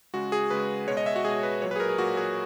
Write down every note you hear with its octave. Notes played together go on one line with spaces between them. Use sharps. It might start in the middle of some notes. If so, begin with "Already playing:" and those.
C#3 G#3 F#4
G#4
C#3 G#3 B4
B2 G#3 C#5
D#5
E5
F#4
B2 G#3 G#4
B4
A#2 F#3 C#5
B4
G#4
A#4
G#4
A#2 F#3 F#4
G#4